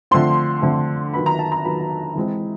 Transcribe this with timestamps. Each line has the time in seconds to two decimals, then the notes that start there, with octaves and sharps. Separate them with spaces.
0.11 D3 F3 A3 C4 C6
0.62 D3 F3 A3 C4
1.14 D#3 F#3 B3 B5
1.26 A#5
1.39 A5
1.52 A#5
1.65 D#3 F#3 B3 B5
2.15 E3 G#3 C4